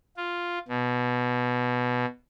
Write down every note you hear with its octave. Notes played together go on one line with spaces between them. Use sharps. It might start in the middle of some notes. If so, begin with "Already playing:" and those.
F4
B2